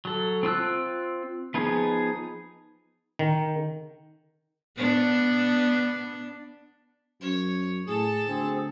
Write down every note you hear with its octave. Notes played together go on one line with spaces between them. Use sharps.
F#3 A4
C4 F4 E6 F#6
F3 B3 D#4 G#4
D#3
B3 D4
F#2 C#5
A2 G#4 A4 A5
D2 C4 G#4